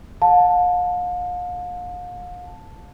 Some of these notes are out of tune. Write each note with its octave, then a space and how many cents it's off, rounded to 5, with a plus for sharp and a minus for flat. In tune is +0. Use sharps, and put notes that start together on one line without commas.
F5 +40 A5 +0